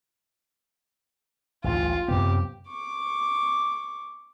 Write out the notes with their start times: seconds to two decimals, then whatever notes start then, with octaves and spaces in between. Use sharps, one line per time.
1.64 A1 D2 G2 F4
2.08 F#2 C3 B3 G4
2.68 C#6 D6